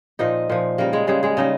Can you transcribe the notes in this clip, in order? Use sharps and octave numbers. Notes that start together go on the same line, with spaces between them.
A#2 F3 D#4 D#5
A#2 F3
C#3 G3 A#3 A#4
G#3 G#4
C#3 G3 G#3 G#4
G#3 G#4
C#3 G3 D#4 D#5